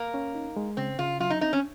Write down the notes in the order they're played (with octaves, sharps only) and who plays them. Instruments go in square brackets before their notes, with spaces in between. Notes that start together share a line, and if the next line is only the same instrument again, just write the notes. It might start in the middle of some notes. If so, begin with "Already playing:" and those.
Already playing: [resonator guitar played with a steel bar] A#3
[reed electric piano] C#4
D#4
G#3
[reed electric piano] C#3 [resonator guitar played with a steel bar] C4
[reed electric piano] C#3 [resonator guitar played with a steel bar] F4
[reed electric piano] F#3 [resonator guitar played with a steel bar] F4
[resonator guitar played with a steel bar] D#4
[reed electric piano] C4 [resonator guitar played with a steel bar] D#4
[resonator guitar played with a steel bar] C#4